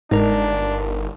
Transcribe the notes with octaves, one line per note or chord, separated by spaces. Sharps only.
G1 G#2 D4 D#4 A#4